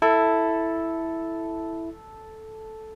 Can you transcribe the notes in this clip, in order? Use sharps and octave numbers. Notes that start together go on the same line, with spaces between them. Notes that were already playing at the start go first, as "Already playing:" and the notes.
E4 A4